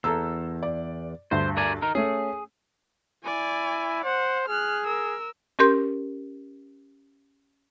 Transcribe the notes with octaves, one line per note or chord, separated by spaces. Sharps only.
E2 A4 A#5 E6
D5
D2 G2 C5
A#4 D5 G#5
D#4 A#4
A3 C#4 G#4
E4 D5 G#5
C5 F#5
G#4 F6 F#6
A#4 E6
C#4 G4 A#4 C6 G6